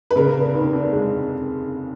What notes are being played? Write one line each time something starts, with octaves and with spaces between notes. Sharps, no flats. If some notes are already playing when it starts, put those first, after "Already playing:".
B4
C#3 A#4
F1
D#2
F1
G#3